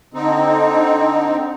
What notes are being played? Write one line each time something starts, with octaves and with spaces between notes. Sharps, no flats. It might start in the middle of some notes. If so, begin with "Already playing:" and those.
D3 C4 D#4